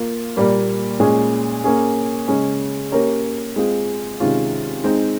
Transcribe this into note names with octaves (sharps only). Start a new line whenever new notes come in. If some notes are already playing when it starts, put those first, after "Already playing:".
Already playing: A#3 F4
A#2 G3 A#3 F4
A#2 G#3 C#4 G#4
A#3 C#4 G#4
C#3 G#3 C#4
A#3 C#4 G4 A#4 C#5
G#3 C4 F4 G#4
C3 D#3 G#3 C#4 F4
G#3 C4 D#4